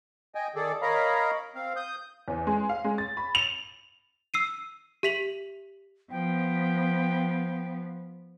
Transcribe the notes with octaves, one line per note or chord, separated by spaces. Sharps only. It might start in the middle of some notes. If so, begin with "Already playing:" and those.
D#5 G5 G#5
D#3 G#4 A4 D5
A#4 C#5 D#5 F5 A#5 B5
C4 F5
D#6 G6
E2
G#3
F5
G#3
A6
B5
F7
E6 C7 D#7
G4 E5 B6 F7 F#7
F3 B3 G5